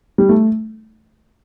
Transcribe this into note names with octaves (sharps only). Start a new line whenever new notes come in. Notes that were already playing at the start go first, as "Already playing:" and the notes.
G3
A3